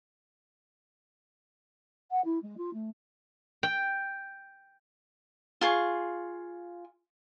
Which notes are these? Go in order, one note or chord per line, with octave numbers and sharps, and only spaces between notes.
F#5
E4
G#3
F4
A3
G5
F4 G#4 C#6